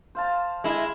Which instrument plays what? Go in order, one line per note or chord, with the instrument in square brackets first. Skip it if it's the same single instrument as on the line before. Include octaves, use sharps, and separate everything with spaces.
[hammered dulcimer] C5 F5 A5
[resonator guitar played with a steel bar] G#3 E4